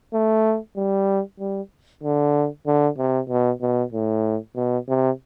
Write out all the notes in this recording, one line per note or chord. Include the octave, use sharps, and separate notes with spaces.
A3
G3
G3
D3
D3
C3
B2
B2
A2
B2
C3